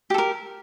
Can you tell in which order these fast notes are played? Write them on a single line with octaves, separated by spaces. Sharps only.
G4 A4 A#4